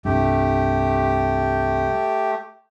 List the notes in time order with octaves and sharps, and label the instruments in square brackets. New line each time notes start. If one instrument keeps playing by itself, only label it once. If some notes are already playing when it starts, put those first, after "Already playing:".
[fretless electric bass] C2 G2 [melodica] A3 G4